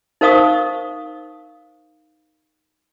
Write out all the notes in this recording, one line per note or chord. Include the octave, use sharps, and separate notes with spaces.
D#4 A#4 C5 F5 C#6 D#6